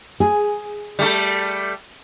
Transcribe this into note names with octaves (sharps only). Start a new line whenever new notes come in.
G#4
G3 A3 A4